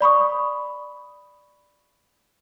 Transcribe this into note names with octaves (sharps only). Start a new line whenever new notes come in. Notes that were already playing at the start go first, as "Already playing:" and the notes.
D5 B5 C#6 D#6